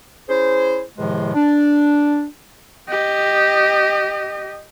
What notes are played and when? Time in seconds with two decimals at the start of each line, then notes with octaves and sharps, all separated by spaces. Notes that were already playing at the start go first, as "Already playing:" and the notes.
0.29 C#4 E4 G#4 C5
0.98 E2 A2 C3 D#3 F3 G#3
1.34 D4
2.88 G4 D#5